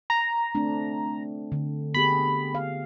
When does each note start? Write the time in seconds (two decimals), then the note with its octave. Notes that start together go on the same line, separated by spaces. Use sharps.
0.10 A#5
0.55 A3 C4 D4
1.52 D3
1.94 B3 G4 G#4 B5
2.55 F5